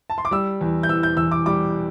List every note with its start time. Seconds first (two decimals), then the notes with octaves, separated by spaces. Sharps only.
0.10 A5
0.18 C6
0.25 D6
0.31 G3 E6
0.61 E2
0.83 G6
0.89 E3 E6
1.03 G6
1.17 E2 E6
1.31 D6
1.46 G3 D6